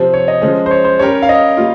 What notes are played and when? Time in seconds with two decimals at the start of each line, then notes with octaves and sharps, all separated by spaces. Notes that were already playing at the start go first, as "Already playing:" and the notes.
Already playing: C3 F3 C4 G4 C5
0.14 C#5
0.28 D#5
0.42 F3 G#3 C#4
0.66 C5
0.71 C#5
0.85 C5
0.99 G3 C#4 G4 A#4 C#5
1.22 F5
1.29 D#5
1.57 G3 A#3 F4